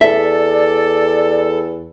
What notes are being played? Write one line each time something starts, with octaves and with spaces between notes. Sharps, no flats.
E2 A4 D5 E5